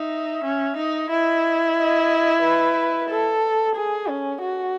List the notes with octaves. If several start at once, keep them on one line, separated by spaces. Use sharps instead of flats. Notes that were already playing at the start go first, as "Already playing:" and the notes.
Already playing: D#4 E5
C#4
D#4
E4 D#5
D#5
B4
A4
G#4
C#4
F#4